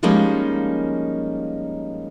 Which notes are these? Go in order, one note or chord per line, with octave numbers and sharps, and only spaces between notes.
F3 G3 G#3 A#3 C#4 D#4